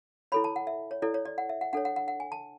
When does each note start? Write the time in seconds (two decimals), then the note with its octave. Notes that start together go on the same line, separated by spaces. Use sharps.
0.32 E4 A4 C#5 B5
0.44 A5
0.56 F#5
0.67 E5
0.91 C#5
1.02 E4 A4 C#5 D5
1.14 C#5
1.26 D5
1.38 F#5
1.49 E5
1.61 F#5
1.73 D4 A4 C#5 F#5
1.85 F#5
1.96 F#5
2.08 F#5
2.20 G#5
2.32 A5